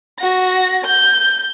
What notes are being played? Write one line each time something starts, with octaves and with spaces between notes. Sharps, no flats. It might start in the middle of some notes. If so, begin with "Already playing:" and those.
F#4 A#6
G6